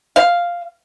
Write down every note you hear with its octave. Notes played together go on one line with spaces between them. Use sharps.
F5